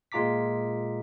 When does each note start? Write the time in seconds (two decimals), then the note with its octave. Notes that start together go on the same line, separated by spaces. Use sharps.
0.12 A#2 G#3 F4 A#5 D6 B6